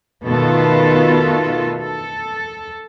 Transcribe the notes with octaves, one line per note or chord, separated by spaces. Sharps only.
B2 D#3 A3 B3 F4 A4
A4